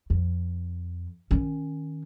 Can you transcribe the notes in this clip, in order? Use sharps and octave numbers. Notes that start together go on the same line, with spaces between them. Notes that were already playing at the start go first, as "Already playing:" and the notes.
F2
D#3 C#4